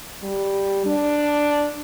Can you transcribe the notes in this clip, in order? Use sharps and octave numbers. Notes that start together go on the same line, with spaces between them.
G3
D4